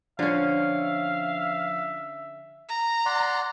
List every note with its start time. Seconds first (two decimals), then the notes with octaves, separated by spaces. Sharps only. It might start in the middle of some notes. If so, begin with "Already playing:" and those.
0.19 D3 F3 C#4 F5
0.72 E5
2.68 A#5
3.06 D5 F#5 C6